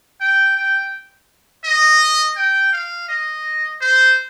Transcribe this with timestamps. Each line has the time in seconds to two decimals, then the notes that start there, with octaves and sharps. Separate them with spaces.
0.20 G5
0.57 G5
1.64 D#5
2.36 G5
2.72 F5
3.09 D#5
3.81 C5